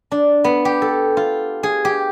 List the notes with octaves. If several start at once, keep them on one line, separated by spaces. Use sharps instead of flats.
D4
B3
G4
A4
F4
G#4
G4